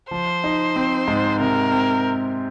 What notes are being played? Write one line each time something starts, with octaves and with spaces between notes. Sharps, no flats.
F3 C5
D#4
C4
G#2
C3 A#4
C4